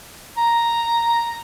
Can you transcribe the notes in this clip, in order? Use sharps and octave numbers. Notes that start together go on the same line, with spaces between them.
A#5